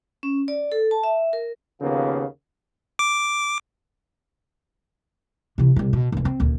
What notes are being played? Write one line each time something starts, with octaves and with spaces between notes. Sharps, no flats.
C#4
D5
A4
A5
E5
A#4
D#2 C#3 F3 A#3 B3
D6
C3 E3
C2 C3
B2
F1 C#3
C4
D#1 D2